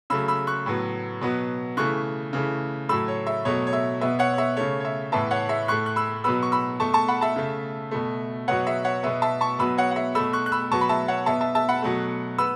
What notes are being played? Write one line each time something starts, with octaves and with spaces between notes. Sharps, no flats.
C#3 F#3 A3 B5 E6
B5 E6
C#6 F#6
A2 F#3 B3
B2 F#3 B3
C#3 E3 A3 C#6 F#6
C#3 E3 A3
A2 F#3 A3 B5 E6
C#5
E5
B2 F#3 A3 C#5
C#5
E5
B2 B3 E5
C#5 F#5
C#5
E5
C#3 A3 C#5
C#5
E5
A2 E3 B3 E5 A5
C#5 F#5
E5
A2 A3 C#6 F#6
F#6
B5 E6
B2 F#3 B3 B5 E6
C#6
B5 E6
B2 A3 A5 C#6
A5 C#6
F#5 B5
E5 A5
C#3 A3
B2 A3
B2 F#3 B3 C#5 F#5
E5
C#5 F#5
B2 B3 E5
E5 A5
A5 C#6
B2 F#3 B3 B5 E6
C#5 F#5
F#5
E5
B2 A3 B5 E6
C#6 F#6
F#6
B5 E6
B2 F#3 B3 A5 C#6
B5
E5 A5
C#5 F#5
B2 B3 E5 A5
E5 A5
E5 A5
F#5 B5
B2 F#3 A3
B3 B5 E6